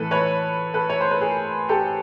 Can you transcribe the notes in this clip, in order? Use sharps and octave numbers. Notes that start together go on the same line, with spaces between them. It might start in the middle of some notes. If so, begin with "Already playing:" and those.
Already playing: A2 E3 A4 B4
B4 C#5
A4 B4
C#5
C5
B4
G#4 A#4
G4 A4